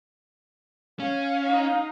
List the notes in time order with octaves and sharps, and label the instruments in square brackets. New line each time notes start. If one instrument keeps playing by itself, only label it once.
[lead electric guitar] C#4 [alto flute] F5
[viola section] D#4